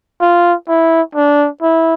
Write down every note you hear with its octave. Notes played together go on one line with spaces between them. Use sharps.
F4
E4
D4
E4